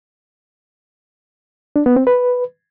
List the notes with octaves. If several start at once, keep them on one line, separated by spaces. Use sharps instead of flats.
D4
B3
C4
B4